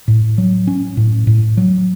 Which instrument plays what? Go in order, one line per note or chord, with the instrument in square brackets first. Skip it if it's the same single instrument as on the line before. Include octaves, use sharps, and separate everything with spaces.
[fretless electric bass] A2
F#3
C#4
A2
A2
F#3